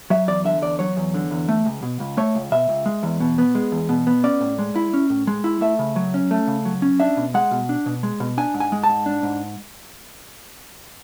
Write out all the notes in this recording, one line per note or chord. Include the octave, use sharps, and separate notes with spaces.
F#3 E5
E2 D5
D3 E5
E2 D5
F#3 C#5
E2
D3
E2
A3
C#2
B2
C#2
A3 C#5
C#2
B2 E5
C#2
G#3
E2
B2
B3
G#3
E2
B2
B3
C#4 D5
A2
G#3
E4
C#4
A2
G#3
E4
A3 E5
C#3
F#3
C#4
A3
C#3
F#3
C#4
D4 E5
B2
G#3 F#5
B2
D4
B2
G#3
B2
D4 G#5
G#2
G#5
G#3
A5
G#2
D4
G#2